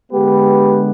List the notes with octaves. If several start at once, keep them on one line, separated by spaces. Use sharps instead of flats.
D3 G#3 B3 G4 B4